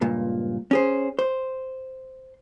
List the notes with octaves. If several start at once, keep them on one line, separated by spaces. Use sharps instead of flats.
C#2 G2 A#2
C#4 G#4 C5
C5